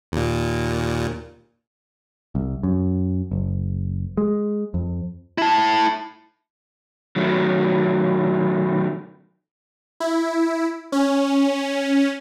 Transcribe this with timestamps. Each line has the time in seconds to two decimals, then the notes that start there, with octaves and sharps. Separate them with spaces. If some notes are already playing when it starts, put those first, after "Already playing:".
0.12 D#2 A#2
2.35 C2
2.63 F#2
3.32 F#1
4.17 G#3
4.74 F2
5.38 E4 A5
7.16 D#3 F#3 A3
10.00 E4
10.92 C#4